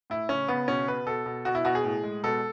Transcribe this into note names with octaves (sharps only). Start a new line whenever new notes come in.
A2 E4
C#3 C#4
C#3 B3
B2 C#4
B2 B4
B2 A4
B2
B2 F#4
E4
B2 F#4
G#4
A2
G#3
B2 A4